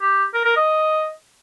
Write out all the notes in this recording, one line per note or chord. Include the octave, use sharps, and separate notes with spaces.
G4
A#4
A#4
D#5